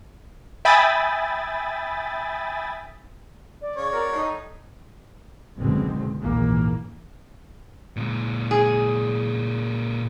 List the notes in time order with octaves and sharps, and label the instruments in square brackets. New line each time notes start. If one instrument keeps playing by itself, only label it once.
[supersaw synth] E5 G5 G#5 B5 D#6 A6
[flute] D5
[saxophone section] C#3 [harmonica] C#5
[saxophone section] C4 F#4 A#4
A2 D#4
[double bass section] F#1 B1 B2 D3 G#3 C4
A#1 D#2 G#2 E3 A#3
[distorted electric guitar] A#2 G#3
[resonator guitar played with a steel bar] G#4